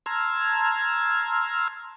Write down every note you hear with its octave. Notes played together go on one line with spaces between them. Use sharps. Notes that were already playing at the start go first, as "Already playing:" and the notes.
A5 A#5 C6 E6 F6 G#6